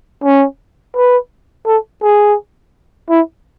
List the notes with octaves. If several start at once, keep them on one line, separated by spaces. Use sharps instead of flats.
C#4
B4
A4
G#4
E4